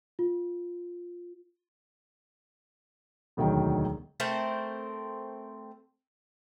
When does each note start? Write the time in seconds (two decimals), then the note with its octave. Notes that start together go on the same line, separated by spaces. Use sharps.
0.19 F4
3.37 E1 D2 D#3 F#3 G5
4.20 A3 C4 A#4 C5